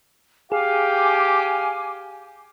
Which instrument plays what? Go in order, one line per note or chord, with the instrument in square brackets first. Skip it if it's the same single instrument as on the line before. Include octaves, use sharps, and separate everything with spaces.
[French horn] G4 [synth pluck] G#4 [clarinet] F5 [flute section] G#5 D6